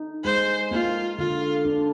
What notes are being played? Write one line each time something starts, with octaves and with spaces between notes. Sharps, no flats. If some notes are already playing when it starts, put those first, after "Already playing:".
Already playing: D#4
G#3 C5
A#3 F4
D3 F4
D4